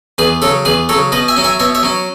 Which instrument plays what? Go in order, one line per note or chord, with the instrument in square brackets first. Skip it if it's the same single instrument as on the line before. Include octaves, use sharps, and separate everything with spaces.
[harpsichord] E2 G#4 B4
C#3 F#3 A4 C#5
E2 G#4 B4
F#3 A4 C#5
C#3
B2 B4 D#5
E5 G#5
F#3 C#4
E5 G#5
B2 C#5 E5
C#5 E5
F#3 C#4